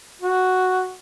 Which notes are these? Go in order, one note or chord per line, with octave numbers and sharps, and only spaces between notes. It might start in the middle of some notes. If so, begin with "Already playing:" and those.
F#4